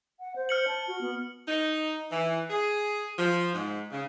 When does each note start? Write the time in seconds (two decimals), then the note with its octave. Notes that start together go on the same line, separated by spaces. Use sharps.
0.20 F#5
0.36 C5
0.49 F6 C#7 F#7
0.68 A5
0.88 F#4
1.01 B3
1.47 D#4
2.11 E3
2.50 G#4
3.17 F3
3.54 G#2
3.92 C#3